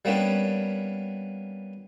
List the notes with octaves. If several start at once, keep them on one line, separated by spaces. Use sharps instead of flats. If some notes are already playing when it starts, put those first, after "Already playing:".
G3 A#3 B3 C#4 D4 G4